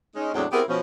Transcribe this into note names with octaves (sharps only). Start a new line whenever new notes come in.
G#3 C#4 D#4
E2 A2 F#3 G#3 C4 D4
B3 C4 E4 G4 G#4 A#4
B2 F3 C#4